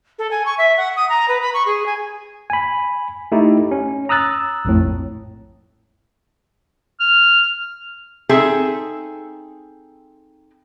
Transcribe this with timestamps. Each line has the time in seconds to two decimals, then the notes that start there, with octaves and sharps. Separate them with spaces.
0.19 A4
0.31 G#5
0.46 C#6
0.58 E5
0.77 F#5
0.97 D#6
1.09 A#5
1.28 B4
1.42 B5
1.54 C#6
1.66 G#4
1.86 G#5
2.50 G#5 B5
3.32 A3 D#4 E4 G4
3.71 C#4
4.09 A#5 D#6 E6 F#6 A6
4.65 A#1 F2 A2
7.00 F6
8.29 C4 D#4 G#4 A4 E5